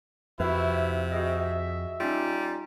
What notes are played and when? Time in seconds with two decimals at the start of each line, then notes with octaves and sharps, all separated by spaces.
0.40 F2 C3 E4 F#4 B4
1.12 F#4 G#4 D#5 E5
2.00 G3 C#4 D#4 F4